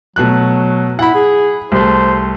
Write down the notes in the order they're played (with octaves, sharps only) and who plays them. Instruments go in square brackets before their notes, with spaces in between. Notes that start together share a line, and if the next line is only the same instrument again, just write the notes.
[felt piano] B2 A3 F#6 [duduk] F#3
[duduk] E4 [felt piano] F#5 B5
[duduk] G#4
[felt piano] C2 A3 [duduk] C5